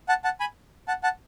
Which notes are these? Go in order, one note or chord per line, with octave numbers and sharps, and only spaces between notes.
F#5 A5
F#5 A5
G#5 B5
F#5 A5
F#5 A5